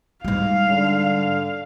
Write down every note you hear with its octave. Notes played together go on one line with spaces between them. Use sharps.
G#2 G3 F5
D3